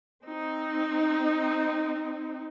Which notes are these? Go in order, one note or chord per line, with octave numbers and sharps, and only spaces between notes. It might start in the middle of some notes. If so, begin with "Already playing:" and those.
C4 D#4